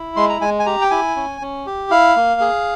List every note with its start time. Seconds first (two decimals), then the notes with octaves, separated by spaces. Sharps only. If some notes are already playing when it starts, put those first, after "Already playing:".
Already playing: E4
0.16 G#3 C6
0.29 A#5
0.41 G#3 G#5
0.59 G#5
0.66 G4 A#5
0.81 G5
0.91 E4 G#5
1.16 C#4
1.41 C#4
1.66 G4
1.91 E4 F5
2.16 A#3
2.41 G#4